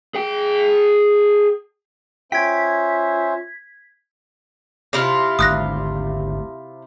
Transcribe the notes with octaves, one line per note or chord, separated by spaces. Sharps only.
G#4 G5
C#4 F4 C5 E5 G5 G#6 B6
C3 E4 F4
G#1 D2 D#6 F#6 A#6